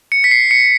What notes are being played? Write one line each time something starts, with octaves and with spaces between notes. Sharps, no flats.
C#7
B6
C7
C#7